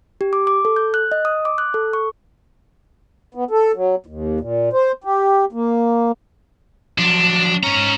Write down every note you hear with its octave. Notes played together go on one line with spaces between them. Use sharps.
G4
D6
D6
A4
G6
F#6
D#5
D#6
D6
F#6
A4
C#6
B3
A4
F#3
D#2
A#2
C5
G4
A#3
F3 F#3 D4
G#2 C#4 A#5